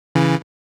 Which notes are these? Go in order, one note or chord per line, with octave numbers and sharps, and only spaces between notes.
C#3 E3